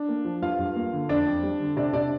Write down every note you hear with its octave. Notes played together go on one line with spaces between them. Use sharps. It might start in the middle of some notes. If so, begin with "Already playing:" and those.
Already playing: D4
A#3
F3
G2 F4 F5
G2
A#3
D3
F2 D4 D5
F2
G3
D3
C3 D4 D5
C3 D4 D5